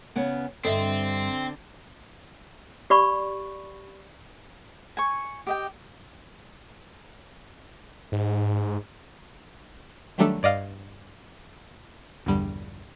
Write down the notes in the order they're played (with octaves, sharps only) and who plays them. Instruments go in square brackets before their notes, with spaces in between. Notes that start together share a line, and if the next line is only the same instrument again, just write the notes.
[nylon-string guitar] C#3 B3 C#4
[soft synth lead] G2 [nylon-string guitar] D3 [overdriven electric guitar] C4 [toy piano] A4 D#5 E5
[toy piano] G4 D5 B5 C#6
[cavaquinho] G#5 C#6
G4 D#5 G5
[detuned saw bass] G#2
[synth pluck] D#3 F#3 G3 A3 D4 A4
G2 D5 D#5 F5
A#1 E2 G2 D3 G3